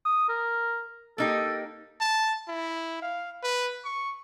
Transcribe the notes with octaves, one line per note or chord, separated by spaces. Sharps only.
D#6
A#4
A#3 D#4 G4 A4
A5
E4
F5
B4
C#6